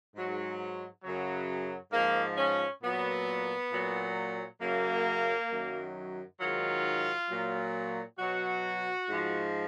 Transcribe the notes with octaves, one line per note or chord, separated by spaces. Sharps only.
G#2 F#3
F#2 C#3 F#3
G#2 F3 A#3
C#4
A#2 F#3 B3
A#2 F#3
F#2 C#3 F#3 A#3
F#2 D#3 F#3
G#2 D#3 F#3 F4
A#2 F#3
B2 F#3 F#4
G#2 F3